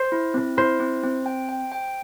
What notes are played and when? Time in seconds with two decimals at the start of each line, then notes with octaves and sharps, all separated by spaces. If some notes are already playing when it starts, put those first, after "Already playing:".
Already playing: C5
0.12 E4
0.34 C4
0.57 E4 C5
0.80 C4
1.03 C4
1.26 G5
1.49 G5
1.72 G5